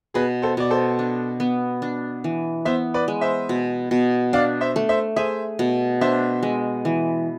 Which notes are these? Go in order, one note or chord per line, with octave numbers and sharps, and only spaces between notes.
B2 G#4 B4
A4 C5
B2 D5
A4 C5
D4
B3
D4
E3
B3 C5 E5
B4 D5
G#3
C5 E5
B2
B2
D4 D5 F5
C5 E5
A3
C5 E5
G#4 C5 E5
B2
D4 C5 E5
G#3
E3